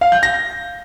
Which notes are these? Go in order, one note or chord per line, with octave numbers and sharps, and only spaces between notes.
F5
G6
A#6